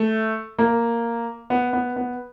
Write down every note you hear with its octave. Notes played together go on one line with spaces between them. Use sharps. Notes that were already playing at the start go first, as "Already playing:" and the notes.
Already playing: A3
A#3
B3
B3
B3